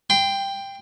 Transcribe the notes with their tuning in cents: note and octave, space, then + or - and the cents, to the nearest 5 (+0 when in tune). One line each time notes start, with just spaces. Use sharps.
G5 +10 C6 -25